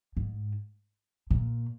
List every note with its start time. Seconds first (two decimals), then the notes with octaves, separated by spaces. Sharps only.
0.17 G#2
1.31 A#2